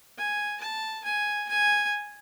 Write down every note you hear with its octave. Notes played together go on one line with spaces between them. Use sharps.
G#5
A5
G#5
G#5